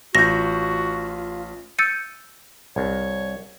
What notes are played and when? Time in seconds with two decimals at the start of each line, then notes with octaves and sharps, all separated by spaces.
0.15 A1 F4 F#4 G6 A#6
1.79 E6 G6 A6 C#7 D#7
2.76 C2 C#5